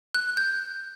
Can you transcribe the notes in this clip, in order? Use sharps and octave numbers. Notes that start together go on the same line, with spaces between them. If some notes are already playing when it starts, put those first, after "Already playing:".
F#6
G6